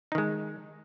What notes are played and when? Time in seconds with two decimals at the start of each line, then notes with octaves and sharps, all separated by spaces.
0.12 D#4
0.15 D#3
0.18 G#3